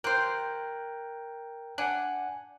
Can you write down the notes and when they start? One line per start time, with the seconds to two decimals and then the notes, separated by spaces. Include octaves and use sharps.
0.04 G4 A#4 C5 G5 F#6
1.78 D4 F#5 G#5 F#6